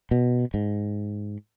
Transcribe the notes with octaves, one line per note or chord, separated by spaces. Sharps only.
B2
G#2